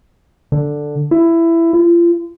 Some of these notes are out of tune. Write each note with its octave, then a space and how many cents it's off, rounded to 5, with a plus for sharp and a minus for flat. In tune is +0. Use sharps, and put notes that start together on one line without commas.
D3 +5
E4 +15
F4 -35